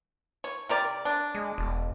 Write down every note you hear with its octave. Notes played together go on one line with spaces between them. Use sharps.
C#5
C3 A#4 D5
D4
G#3
E1